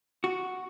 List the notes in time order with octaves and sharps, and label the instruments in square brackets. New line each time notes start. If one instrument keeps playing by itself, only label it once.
[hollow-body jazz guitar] F#4